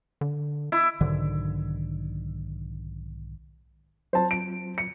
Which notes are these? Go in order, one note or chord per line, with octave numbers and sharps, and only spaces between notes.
D3
E4
B1 G#2 D3 D#3
F#3 C4 F4 C5 A5
D7
C#7